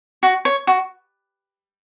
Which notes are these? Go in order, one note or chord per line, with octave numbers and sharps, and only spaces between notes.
F#4
C#5
F#4